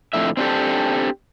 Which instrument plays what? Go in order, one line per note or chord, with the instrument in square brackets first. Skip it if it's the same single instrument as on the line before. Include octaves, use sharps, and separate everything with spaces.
[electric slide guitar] F2 A2 D3 E5
C4 D4 G4 A4